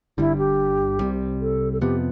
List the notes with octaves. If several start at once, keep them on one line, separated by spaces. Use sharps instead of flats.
G1 G2 D3 G3 E4
G4
C2 C3 G3
A4
A4
F2 C3 F3 B3 G4